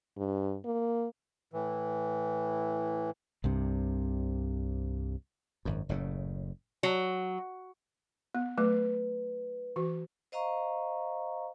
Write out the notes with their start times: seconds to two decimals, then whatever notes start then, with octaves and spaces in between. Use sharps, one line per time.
0.17 G2
0.64 A#3
1.53 A2 E3
3.44 C2 G2 C3
5.65 G#1 F#2
5.89 F#1 A2 C#3
6.83 F#3
8.35 B3
8.58 F#3 A3 B4
9.76 E3 F#4
10.32 C5 D#5 F5 A#5 C#6